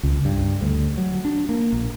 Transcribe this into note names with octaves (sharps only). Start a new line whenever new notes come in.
C#2
G2
D2
F#3
D4
A#3
A#1